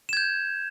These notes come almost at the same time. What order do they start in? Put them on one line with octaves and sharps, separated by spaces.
E7 G#6 G6